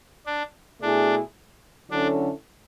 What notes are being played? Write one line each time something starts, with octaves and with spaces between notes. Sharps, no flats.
D4
B2 A3 D4 E4 G#4
D3 F#3 C#4 D4 E4 A4